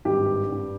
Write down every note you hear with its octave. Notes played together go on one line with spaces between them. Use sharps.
G#1 G2 G3 G4
G2 G3